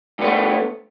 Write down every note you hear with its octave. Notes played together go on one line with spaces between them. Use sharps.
G2 A3 B3